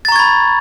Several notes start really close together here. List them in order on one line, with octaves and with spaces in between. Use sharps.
A6 A#5 C#6 G#6 B5